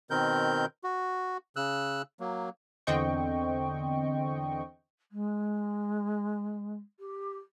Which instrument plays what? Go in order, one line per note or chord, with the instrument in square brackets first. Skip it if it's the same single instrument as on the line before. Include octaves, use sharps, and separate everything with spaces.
[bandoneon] B2 D#3 C4 A#4 G6
F#4
C#3 E6 F#6
F#3 A#3
[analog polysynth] E2 D3 C4 D#5 G5 C#6
[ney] G#3
G4